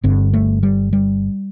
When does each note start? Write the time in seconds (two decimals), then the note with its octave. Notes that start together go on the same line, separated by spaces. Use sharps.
0.04 G1 G2 D3 C4
0.34 A3
0.63 G3
0.93 G3